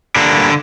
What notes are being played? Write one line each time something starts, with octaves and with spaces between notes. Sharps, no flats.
D3 G3 A#3 D4